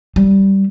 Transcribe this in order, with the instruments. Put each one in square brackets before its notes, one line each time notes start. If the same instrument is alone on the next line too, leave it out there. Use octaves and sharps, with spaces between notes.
[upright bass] G3